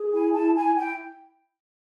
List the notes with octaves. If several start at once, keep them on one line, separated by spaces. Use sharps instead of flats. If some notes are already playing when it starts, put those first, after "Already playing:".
Already playing: G#4
E4 G#5
E4 A5
E4 G#5
E4 G5